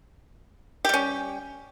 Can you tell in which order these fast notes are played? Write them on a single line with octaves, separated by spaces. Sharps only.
G4 G3 C#4